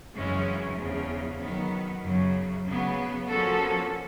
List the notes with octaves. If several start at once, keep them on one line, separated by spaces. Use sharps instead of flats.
F#2 C#3 E3 G#3 C#4
E2 C#3 F3
D#3 F#3 B3
F#2 C#3 F#3
C#3 F#3 B3
F3 A#3 C#4 F#4 A4